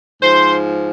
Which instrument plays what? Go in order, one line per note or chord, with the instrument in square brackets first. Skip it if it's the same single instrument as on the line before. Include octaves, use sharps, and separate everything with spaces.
[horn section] G#2 F3 C5